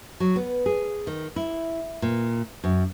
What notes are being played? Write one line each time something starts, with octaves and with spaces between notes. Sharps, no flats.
F#3
B3
G#4
D#3
E4
A#2
F#2